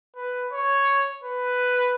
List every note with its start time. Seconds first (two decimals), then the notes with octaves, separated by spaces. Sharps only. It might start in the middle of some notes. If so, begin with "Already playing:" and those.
0.16 B4
0.52 C#5
1.23 B4